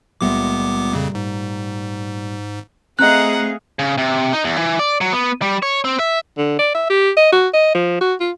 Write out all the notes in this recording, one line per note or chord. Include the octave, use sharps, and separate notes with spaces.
C#2 A#2 G3 A3 B3 D6
F2 C#3
G#2
A3 C4 G#4 D#5 F5 F#5 A#5 F#6
C#3
C3
D#4
E2
E3
D5
F#3
B3
G3
C#5
C4
E5
D3
D5
E5
G4
D#5
F#4
D#5
F3
F#4
F4